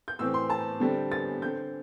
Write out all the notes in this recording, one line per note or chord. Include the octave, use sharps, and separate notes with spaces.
G6
A2 E3 C4 E6
C6
A5
D3 G3 C4
A6
D3 C4 G6